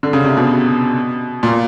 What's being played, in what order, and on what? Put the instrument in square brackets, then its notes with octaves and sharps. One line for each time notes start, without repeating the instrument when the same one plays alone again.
[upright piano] D3
C#3
C3
B2
A#2